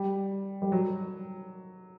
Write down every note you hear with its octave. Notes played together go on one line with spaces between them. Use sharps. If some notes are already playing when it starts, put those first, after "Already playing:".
Already playing: G3
G3
F#3